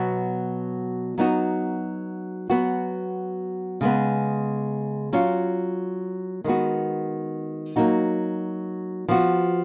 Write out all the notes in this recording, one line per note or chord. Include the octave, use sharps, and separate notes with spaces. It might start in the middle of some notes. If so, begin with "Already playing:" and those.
Already playing: B2 F#3 B3 F#4
F#3 B3 D#4 F#4
F#3 B3 F#4
C#3 G#3 B3
F#3 C#4 F4
D#3 G#3 B3 F#4
F#3 A#3 D#4 F#4
F3 B3 F#4